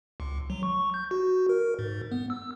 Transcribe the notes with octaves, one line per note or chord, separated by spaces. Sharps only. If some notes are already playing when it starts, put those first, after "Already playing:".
C#2
F#3
C#6
G6
F#4
A#4
G#2
B3
E6